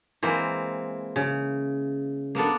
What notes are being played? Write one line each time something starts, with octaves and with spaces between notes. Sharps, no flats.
E3 G#3 A#3 C4
C#3
A#3 B3 D4 A4